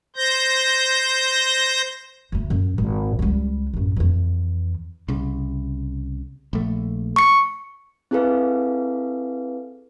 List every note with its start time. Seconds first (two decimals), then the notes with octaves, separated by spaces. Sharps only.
0.16 C5 G6 A#6
2.32 D2 A3
2.50 F#2
2.78 G#1
3.19 C#2 G3
3.74 A1 F#2
3.96 F2 E3
5.08 C2 C#3
6.53 A#1 A3
7.16 C#6 C#7
8.11 C4 E4 G#4 A4 B4 F5